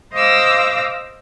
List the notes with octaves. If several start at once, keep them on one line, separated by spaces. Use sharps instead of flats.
C5 D#5 F5 D6 E6 A#6